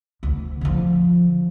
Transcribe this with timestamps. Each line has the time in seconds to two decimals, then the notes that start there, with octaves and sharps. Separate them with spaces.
0.23 D2
0.61 D3 F3